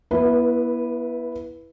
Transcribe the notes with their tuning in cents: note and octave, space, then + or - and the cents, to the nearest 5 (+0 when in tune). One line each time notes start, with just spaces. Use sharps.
B3 -40 E4 +0 B4 -10